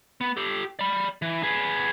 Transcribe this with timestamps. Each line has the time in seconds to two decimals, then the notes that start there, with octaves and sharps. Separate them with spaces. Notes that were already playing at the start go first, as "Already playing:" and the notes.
0.21 B3
0.37 G4 A4
0.79 D5 B5
1.22 E3
1.43 G#4 B4